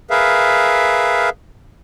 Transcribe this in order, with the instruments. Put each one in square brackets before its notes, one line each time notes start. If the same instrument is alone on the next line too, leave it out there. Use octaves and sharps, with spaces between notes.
[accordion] G#4 A#4 B4 E5 F5